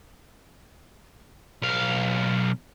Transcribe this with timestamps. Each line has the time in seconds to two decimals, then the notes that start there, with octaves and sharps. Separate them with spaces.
1.62 B1 F5